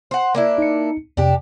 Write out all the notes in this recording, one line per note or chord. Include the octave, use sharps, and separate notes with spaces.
C5 F#5
A#3 D4 E4
D#4 C#7
F2 C3 D4 G4